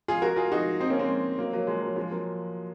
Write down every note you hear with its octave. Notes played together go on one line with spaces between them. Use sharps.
F4 G#4
F#4 A#4
F4 G#4
D#4 F#4
C4 D#4
A#3 C#4
G#3 C4
F#3 A#3
F#3 A#3
F3 G#3
F#3
F3 G#3
F#3 A#3